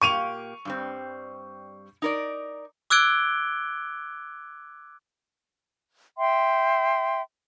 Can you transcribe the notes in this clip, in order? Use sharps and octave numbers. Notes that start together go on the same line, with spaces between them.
A#2 A#3 G4 C#6 D#7 F7
G2 G3 C4
D#4 A#4 D5
D6 E6 F#6 G#6 D7 G7
E5 G5 C6